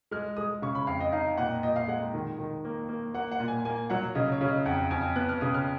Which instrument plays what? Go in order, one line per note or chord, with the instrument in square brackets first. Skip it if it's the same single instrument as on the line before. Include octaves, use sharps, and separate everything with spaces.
[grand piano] G#3 [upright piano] F6
[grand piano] G#3 [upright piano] D#6
[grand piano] C#3 [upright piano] C#6
[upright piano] B5
[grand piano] F2 [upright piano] F5
[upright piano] D#5
[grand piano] D#4 [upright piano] F5
[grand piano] A#2 [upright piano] F#5
[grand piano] A#2 [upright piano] D#5
[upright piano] F5
[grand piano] G#3 [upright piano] F#5
[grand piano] D#3
D#3
A#3
A#3
[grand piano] A#3 [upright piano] F#5
[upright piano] F#5
[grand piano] A#2
[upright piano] G#5
[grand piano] A#3 [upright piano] G#5
[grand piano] F#3 [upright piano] F#5
[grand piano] C#3 [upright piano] D#5
[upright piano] C#5
[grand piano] C#3
[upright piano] D#5
[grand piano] F2 [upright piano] F#5
[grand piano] F2 [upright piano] G#5
[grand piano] B3 [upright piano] F#6
[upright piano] F6
[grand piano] C#3 [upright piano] D#6
[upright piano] F6